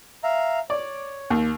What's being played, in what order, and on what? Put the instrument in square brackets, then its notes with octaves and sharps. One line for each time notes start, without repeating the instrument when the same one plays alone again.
[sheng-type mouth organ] E5 F5 A#5
[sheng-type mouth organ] C#5 [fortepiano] D5
[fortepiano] D#2